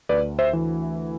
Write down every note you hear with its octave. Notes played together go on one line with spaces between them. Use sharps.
D2 B4 D5
C5 E5
E3